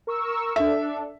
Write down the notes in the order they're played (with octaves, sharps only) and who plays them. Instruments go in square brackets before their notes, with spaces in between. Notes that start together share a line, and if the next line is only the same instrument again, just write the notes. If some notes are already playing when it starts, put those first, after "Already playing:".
[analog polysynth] A#4 C#6 E6
[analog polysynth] D4 A4 [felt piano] E5